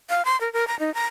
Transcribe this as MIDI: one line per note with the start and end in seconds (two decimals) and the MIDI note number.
0.10 0.25 77
0.25 0.39 84
0.41 0.51 70
0.53 0.67 70
0.68 0.78 82
0.80 0.93 63
0.95 1.06 82